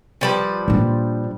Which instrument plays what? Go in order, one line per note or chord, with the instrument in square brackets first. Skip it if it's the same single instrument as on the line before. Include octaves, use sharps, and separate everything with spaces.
[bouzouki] F3 G3 B4
[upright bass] A#2 D4